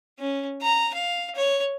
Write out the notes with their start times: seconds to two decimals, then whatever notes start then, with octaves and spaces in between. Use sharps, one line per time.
0.19 C#4
0.62 A#5
0.94 F5
1.35 C#5